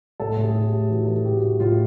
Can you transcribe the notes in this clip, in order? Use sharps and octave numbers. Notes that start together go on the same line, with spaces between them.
A2 A4
A2
G#4
A2
G4
A2
E3 F#4
E3 A4
G#4
A2 G4
F#4
A2
A2 F4